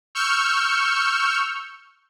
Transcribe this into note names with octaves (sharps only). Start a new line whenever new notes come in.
C#6 E6 F6 G6 C#7